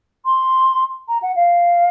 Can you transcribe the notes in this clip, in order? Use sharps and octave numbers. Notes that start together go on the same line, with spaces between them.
C6
A#5
F#5
F5